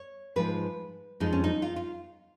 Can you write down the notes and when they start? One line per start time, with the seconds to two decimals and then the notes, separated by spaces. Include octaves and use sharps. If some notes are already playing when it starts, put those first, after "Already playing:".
Already playing: C#5
0.36 G#2 F3 G#3 B4
1.20 F2 F3 G#3 D#4
1.33 C#4
1.44 D#4
1.62 F4
1.76 F4